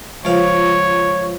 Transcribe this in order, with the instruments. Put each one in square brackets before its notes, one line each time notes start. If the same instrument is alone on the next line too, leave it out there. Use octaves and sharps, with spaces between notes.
[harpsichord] C#2 F3 F5 [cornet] C#5